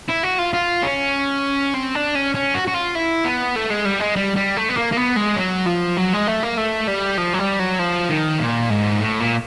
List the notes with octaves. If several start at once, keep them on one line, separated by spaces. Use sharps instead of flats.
E4
F#4
F4
F4
C#4
C4
D4
C#4
C#4
F#4
F#4
F4
E4
B3
A3
G#3
G3
G#3
G3
G3
A3
B3
A#3
A#3
B3
G#3
F#3
F3
F#3
G#3
A3
A#3
A3
G3
F3
F#3
G3
F#3
F3
D#3
A#2
G#2
A2
A#2